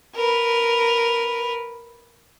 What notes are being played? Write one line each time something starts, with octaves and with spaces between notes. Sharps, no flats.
A#4 B4